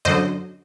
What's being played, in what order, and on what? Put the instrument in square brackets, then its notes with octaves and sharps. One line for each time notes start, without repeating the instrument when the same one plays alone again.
[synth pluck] F#2 D3 F#3 C5 D#5